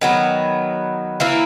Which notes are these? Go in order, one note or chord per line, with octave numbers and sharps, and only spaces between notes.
D#3 F#3 B3
E3 A#3 E4